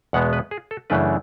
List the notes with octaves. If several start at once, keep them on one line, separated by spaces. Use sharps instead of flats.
E2 B2 G#3 B3 F#5
B4
G#4
A4
F#2 C#3 E3 A3 D4 B4